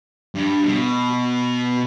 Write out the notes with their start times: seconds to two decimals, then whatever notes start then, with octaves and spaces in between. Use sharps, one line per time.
0.35 G2
0.64 B2